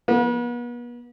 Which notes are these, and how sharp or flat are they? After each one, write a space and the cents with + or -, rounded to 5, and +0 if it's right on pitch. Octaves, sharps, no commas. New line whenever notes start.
B3 -40